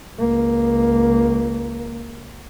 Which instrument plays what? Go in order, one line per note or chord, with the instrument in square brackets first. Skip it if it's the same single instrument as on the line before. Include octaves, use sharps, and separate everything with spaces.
[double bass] C#2 A#3